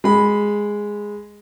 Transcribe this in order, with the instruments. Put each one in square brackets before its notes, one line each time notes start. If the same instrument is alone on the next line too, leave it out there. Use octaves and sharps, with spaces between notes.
[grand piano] G#3 B5